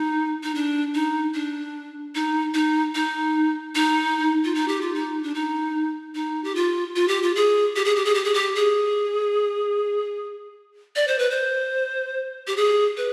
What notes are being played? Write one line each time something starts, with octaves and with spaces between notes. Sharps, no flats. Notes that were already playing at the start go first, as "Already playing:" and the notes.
Already playing: D#4
D#4
D4
D#4
D4
D#4
D#4
D#4
D#4
F4
D#4
G4
F4
D#4
D4
D#4
D#4
G4
F4
F4
G4
F4
G#4
G4
G#4
G4
G#4
G4
G#4
G4
G#4
D5
C5
B4
C5
G4
G#4
B4